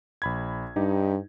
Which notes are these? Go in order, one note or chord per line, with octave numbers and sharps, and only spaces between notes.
A#1 B5 G#6
G2 D#4 G4